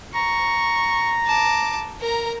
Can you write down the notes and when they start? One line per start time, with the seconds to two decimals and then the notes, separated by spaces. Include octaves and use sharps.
0.15 A#5 C#6
1.26 A5 D6
2.01 A#4 A#5